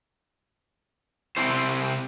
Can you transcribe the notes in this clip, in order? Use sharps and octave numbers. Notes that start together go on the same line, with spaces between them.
C3 C4 E4 C5